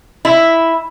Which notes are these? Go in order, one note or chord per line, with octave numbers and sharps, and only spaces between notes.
E4